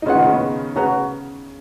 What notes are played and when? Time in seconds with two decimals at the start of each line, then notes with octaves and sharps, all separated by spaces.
0.02 D#4
0.06 C#3 C#4 F4 B4 F#5
0.15 D#3 D#4
0.24 C#3 C#4
0.33 B3
0.76 C#3 C#4 F#4 B4 F#5 A#5